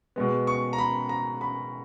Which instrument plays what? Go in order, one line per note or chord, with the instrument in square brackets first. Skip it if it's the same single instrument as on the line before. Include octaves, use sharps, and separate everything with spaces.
[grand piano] B2 G#3 B3
C#6
A#5
B5
A#5
B5